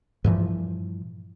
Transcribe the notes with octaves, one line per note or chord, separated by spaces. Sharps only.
G2 A#2 E3 F3